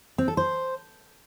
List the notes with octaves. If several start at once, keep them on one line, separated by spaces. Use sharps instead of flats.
C4
A4
C5